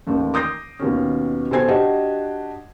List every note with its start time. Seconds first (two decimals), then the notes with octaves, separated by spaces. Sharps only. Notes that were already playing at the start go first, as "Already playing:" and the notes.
0.07 A1 D#2 A3
0.34 D6 D#6 G6 A#6 C7
0.79 D#2 B2 D#3 C#4
1.51 B2 A4 C5 G#5 G#6 C7
1.68 D4 F#4 G4 D#5 F#5 A5